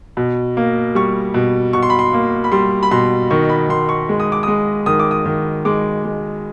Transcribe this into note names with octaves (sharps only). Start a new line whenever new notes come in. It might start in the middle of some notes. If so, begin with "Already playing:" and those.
B2
A#3
G3 C#6
B2
B2 C#6
C6
B5
C6
A#3
B5
G3 C6
B5
B2 C6
D#3 C#6
B5
D#3 C6
C#6
G#3
D#6
D6
G#3 D#6
D#3 D#6
D6
D#6
D#3
G#3 D6
G#3